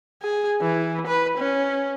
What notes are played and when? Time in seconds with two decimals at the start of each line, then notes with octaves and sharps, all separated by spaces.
0.23 G#4
0.61 E3
1.07 B4
1.38 C#4